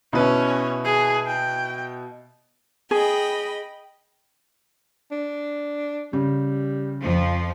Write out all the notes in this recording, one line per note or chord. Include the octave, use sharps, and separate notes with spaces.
B2 C#4 E4 B4 C#5
G#4
G5
G#4 D#5 G5 B5
D4
C#3 G3
F2 F3